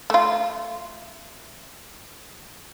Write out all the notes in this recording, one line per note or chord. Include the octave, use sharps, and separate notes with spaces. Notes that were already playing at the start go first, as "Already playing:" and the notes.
A3 F4